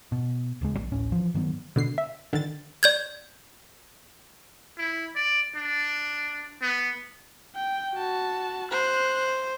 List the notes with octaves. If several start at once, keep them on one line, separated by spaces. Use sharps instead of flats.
B2
D1 C#2 G#3
A#1
D1 A1 C#4
E3 F3
G2 D#3 F#3 B3
B2 D3 C7
E5
D3 D#3 A6
D5 G6 G#6
E4
D5
D4
B3
G5
F#4 A5
C5 F#6